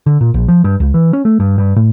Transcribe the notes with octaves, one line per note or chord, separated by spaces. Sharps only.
D3
A#2
A#1
F3
G2
C#2
E3
C#4
A3
G2
G2
A2